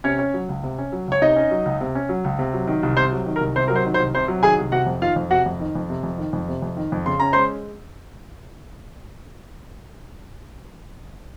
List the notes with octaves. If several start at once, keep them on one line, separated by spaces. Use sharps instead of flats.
C3 C#4 C#5
C#4
F#3
C#2
C3
C#4
F#3
C#2 C#5
C3 D#4 D#5
C#4
F#3
C#2
C3
C#4
F#3
C#2
C3
F#3
D#3
C2
C3 C5
F#3
D#3
A#4
C2
C3 C5
F#3 A#4
C5
D#3
C5
C2
C3 C5
F#3
D#3 G#4 G#5
C2
C3 F#4 F#5
F2
D#3 F4 F5
F2
C3 F#4 F#5
F2
D#3
F2
C3
F2
D#3
F2
C3
F2
D#3
F2
C#3 C6
C#4 A#5
G#3 C5 C6